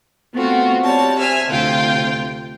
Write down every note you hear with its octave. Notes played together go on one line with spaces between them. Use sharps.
A3 B3 C4 F4 F#4
C3 G3 C#5 A5
C5 E5 G#5 F6
D2 C3 F4 G5